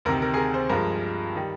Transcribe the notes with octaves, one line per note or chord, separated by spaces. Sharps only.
D2 C3 D#3 A#4
A#4
G#4
A#4
C5
G2 F3 G#3 A#4
D#3 G3